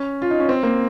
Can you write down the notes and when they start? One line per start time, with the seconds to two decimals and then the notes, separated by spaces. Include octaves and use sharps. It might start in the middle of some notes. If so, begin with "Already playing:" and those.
Already playing: C#4
0.22 F4
0.31 D#4
0.40 C#4
0.49 C4
0.63 A#3